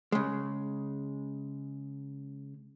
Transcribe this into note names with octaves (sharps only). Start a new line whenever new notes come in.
C#3 G#3